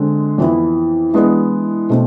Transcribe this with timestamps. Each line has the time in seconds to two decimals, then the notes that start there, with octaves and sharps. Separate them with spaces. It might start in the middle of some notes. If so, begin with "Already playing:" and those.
Already playing: D3 G#3 C4
0.38 F2 E3 B3 E4
1.13 E3 G#3 B3 D4
1.90 B2 A3 C4